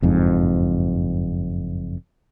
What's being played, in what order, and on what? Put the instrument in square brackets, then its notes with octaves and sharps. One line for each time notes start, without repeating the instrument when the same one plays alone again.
[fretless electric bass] F#1 F2 G#2